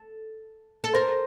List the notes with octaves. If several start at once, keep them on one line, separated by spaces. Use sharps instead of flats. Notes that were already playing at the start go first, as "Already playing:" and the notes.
Already playing: A4
A4
A#4 C5